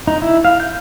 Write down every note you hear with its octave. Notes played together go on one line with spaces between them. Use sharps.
D#4
E4
F5
G6